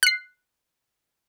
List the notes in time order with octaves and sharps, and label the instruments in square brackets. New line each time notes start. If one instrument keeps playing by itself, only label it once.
[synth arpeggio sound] F#6 C7